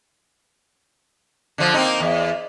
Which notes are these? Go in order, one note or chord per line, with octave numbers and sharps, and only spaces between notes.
D3 F3
A#3 C4 D#4
E2